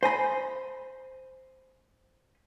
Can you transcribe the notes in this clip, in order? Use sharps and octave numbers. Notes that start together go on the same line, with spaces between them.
C5 G#5 A#5 B5